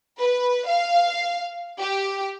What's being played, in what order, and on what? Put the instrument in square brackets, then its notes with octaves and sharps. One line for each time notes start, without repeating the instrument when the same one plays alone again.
[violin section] B4
F5
G4